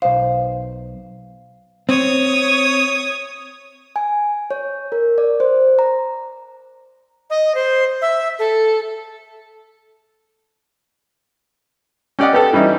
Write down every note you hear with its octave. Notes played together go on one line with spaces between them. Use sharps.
B1 C5 F5
C4 C#5 D#6
G#5
C#5
A#4
D5
C5
A#5
D#5
C5
E5
A4
C#4 G4 D5 D#5 F#5
B3 G4 A4
E3 G3 C#4 D#4 E4